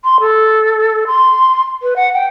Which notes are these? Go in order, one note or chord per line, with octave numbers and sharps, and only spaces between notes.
C6
A4
C6
B4
F#5
G5